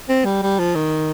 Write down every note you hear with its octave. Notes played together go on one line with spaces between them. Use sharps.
C4
G3
G3
F3
D#3